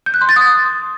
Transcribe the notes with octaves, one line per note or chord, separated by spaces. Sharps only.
G6
F#6
C6
A6
D#6